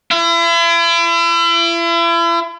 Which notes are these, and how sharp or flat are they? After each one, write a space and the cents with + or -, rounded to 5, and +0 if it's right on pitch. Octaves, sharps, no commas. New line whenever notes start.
E4 +40